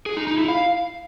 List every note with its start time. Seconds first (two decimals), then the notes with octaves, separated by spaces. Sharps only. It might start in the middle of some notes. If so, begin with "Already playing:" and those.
0.06 G#4
0.17 D#4
0.27 D#4
0.38 E4
0.49 F5